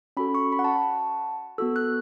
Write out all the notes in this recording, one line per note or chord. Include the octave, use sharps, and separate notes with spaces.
C#4 F#4 A4 B5
C#6
B5
F#5
A5
A5
B3 F#4 A4 E6
F#6